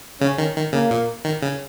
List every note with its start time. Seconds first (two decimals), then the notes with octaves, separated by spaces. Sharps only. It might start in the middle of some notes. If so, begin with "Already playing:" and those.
0.21 C#3 C#4
0.38 D#3
0.56 D#3
0.73 C#3 A#3
0.90 A#2
1.25 D#3
1.42 C#3